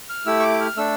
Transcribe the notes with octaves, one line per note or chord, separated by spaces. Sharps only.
F6
A3 E4 G4 E6
C#6
D6
F6
A3 D4 A4 E6